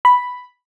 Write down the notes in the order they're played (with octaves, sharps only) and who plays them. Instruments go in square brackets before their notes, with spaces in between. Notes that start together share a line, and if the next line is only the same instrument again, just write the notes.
[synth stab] B5